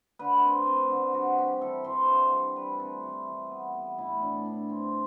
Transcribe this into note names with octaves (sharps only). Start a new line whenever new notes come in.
D3 B4
C4
C4
D3
G3 F#4
C4 G4
E3 A4
E3 C5
D3
G3
G3 B4
C4 A4
E3
E3
B3
B3
A2 E4
A2 D4
A2 D4
C4